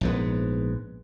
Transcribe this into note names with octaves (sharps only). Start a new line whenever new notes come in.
A#1 G#2 B3